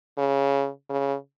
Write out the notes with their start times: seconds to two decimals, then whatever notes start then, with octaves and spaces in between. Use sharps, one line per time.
0.18 C#3
0.90 C#3